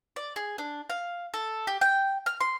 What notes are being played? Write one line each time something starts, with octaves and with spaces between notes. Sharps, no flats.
D5
G#4
D4
F5
A4
G4
G5
F6
C6